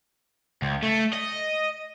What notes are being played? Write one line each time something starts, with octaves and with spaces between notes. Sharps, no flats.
C#2
A3
D#5